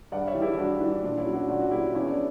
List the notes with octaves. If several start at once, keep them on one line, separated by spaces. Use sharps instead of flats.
G2 D5 F#5
C#5 E5
E3 G3
E4 G4
G2 D4 F#4
E3 G3
A#2 D4
C#4 E4
F#3
D4 F#4
A#2 D4 F#4
F#4
F#3 E4 G4
E2 C#4 E4
D4